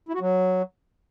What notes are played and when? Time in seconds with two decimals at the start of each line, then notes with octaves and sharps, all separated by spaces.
0.08 E4
0.14 F#4
0.20 F#3